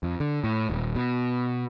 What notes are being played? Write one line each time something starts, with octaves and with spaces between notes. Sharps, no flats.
F2
D3
A2
D#1
B2